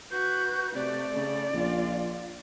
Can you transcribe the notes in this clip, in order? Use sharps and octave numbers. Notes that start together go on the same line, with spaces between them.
F#4 B4 G6
C3 A3 D5
C#3
A#1 F4